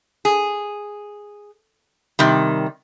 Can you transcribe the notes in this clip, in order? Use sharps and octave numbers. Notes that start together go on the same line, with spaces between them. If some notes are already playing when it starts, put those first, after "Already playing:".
G#4
C3 D#3 G3